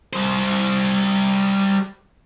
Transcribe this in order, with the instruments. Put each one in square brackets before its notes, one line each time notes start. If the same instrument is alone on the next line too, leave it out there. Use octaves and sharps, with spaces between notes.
[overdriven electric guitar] G3 C5